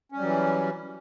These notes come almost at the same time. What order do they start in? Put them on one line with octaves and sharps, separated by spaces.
C#4 G3 F#3 E3